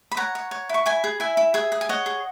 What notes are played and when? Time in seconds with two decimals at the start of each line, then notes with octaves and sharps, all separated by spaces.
0.11 B5
0.17 C#5 F#5 A#5
0.35 C#5
0.51 C#5
0.69 E4 C#6
0.86 E4 G#5 B5
1.04 G#4
1.20 E4 E5 G#5
1.37 E4
1.54 G#4 E5 G#5
1.72 G#4
1.81 G#5
1.89 C#5 D#5 F#5
2.06 G#4